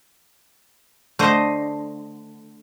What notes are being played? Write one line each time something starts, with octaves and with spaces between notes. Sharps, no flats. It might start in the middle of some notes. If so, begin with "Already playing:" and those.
D3 A3 C5 D#5